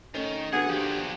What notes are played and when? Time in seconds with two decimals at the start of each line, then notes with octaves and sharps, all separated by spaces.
0.14 D#3 A3 C#4 G7
0.53 D3 B3 F#4 G#4 F#5
0.69 F3 D4 G4